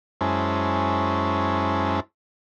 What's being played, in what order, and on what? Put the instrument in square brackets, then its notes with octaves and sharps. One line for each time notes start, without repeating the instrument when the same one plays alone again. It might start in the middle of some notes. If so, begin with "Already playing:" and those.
[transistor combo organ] F#2 G#3 C#4 E4 C5 A5